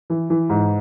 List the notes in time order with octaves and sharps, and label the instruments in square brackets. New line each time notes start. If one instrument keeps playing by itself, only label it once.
[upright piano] E3
E3
G#2